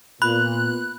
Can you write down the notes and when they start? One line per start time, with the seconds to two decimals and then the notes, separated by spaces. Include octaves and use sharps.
0.22 A#2 B3 F4 B4 B5 F#6